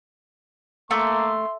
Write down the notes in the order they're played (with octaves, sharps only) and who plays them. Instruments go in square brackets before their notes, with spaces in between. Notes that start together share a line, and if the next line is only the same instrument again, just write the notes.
[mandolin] A3 [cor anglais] A#3 [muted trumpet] C6